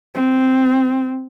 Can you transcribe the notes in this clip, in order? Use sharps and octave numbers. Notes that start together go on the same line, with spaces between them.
C4